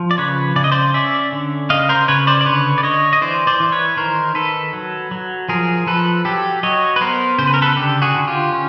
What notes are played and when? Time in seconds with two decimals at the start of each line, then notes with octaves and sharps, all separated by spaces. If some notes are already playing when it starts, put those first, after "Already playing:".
Already playing: F3
0.11 D5
0.18 C#3 B4 C#5
0.56 C#3 D5
0.64 D#5
0.72 C5 D5
0.94 C#4 D5 E5
1.32 D3
1.70 C#3 D#5 F5
1.89 A#4 C5
2.08 C#3 B4 C#5
2.27 C5 D5
2.41 D5
2.45 D3 B4 C#5
2.78 D5
2.83 D3 C#5 D#5
3.13 D#5
3.22 E3 C5 D5
3.47 C5 D5
3.60 E3
3.72 B4 C#5
3.97 D#3 A#4 C5
4.35 D#3 A4 B4
4.73 F#3
5.11 F#3
5.49 F3 G#4 A#4
5.87 F3 A4 B4
6.25 F#3 G4 A4
6.63 F#3 C#5 D#5
6.96 B4
7.01 B3 A#4 C5
7.39 C#3 C5
7.47 B4
7.54 A#4
7.62 A4 B4
7.77 D3 G4 A4
8.02 F#4 G#4
8.15 D3
8.28 F4 G4
8.52 C#4